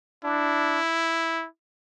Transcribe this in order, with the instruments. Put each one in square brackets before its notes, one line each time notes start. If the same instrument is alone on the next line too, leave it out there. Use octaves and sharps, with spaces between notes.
[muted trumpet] D4 [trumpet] E4